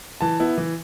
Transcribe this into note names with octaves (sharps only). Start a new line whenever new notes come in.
E3 A5
B3 E4
E3